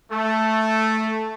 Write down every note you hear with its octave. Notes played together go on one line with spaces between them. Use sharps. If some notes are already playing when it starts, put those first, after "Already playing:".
A3